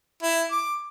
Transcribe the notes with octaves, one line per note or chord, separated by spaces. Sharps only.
E4
D6